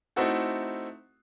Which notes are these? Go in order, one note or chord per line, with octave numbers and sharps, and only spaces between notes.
A3 C4 D#4 E4 F#4 A4